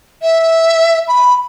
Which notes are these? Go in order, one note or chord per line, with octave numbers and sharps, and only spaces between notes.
E5
B5